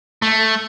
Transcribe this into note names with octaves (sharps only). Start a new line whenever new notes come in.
A3